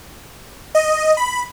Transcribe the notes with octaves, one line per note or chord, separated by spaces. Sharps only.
D#5
B5